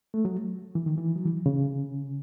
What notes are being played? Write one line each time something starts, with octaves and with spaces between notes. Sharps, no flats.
A3
F#3
E3
D#3
E3
F#3
E3
C#3